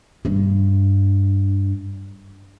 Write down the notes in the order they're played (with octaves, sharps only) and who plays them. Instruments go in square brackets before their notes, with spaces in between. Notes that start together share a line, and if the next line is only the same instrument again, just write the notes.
[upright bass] G2 D4